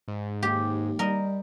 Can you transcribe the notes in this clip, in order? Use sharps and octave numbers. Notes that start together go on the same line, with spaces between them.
G#2
D#2 G4
G3 A#4 D#5